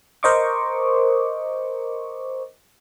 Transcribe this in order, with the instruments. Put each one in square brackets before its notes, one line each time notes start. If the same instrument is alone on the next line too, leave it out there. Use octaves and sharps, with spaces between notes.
[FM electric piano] A#4 C5 D#5 C#6 D6